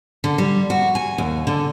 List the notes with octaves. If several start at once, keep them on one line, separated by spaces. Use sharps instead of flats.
D3
G3
F#4
G#5
D#2
D3